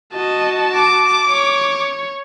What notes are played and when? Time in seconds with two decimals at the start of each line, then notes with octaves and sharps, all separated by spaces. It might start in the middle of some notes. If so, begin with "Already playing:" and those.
0.14 F#4 D#5 A5
0.75 D6
1.29 C#5